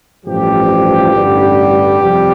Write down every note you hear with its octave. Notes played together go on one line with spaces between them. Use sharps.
A1 G2 F3 G4
A1 G2 D3 G3
F2 C3 G3